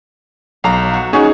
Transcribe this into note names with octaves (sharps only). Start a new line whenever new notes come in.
B1 F5 A#5
F#4
C#4 D#4 F#4 G#4